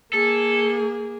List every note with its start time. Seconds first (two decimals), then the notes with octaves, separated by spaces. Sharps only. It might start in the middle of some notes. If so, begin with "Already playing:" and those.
0.13 A#3 G#4 A4